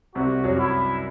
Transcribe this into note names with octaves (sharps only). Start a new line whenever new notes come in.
C2 C3 F#4
F#2 F#3
E4